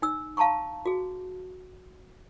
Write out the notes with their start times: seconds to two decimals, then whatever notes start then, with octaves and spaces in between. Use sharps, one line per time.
0.02 D#4 E6
0.37 F5 A5 A#5 C6 C#6
0.86 F#4 G#4